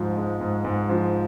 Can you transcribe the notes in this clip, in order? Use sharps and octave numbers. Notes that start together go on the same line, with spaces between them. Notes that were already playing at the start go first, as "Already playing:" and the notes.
Already playing: G#2 F3
G#3
G#2
G#2
F3